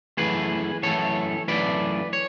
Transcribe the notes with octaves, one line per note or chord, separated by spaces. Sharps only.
F#2 E3 A3 G#4 B4
F#2 E3 A3 A4 C#5
F#2 E3 A3 B4 D5
C#5